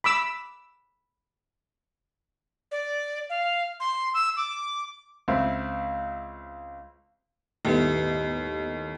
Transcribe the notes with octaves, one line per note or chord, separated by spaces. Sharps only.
B5 D6 E6
D5
F5
C6
E6
D6
C#2 C4 E5 C6
G1 D#2 A2 B3 G4 B4